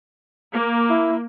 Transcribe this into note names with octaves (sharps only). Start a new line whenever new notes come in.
A#3
E4